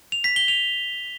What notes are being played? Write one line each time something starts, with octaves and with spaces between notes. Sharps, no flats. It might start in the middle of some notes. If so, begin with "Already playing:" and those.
F7
B6
G7
F7